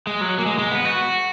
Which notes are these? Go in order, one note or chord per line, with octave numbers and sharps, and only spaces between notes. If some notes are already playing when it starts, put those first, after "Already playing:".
G#3
F#3
A#3
G#3
G#3
B3
F#4